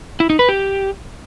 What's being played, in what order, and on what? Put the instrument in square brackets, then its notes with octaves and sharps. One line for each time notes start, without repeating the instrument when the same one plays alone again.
[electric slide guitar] E4
D#4
B4
G4